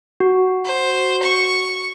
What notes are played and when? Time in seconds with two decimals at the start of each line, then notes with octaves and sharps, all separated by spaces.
0.20 F#4
0.65 C5
1.23 C#6